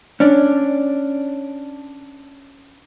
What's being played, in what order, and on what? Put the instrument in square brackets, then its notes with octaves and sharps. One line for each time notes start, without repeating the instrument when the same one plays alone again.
[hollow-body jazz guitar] C#4 D4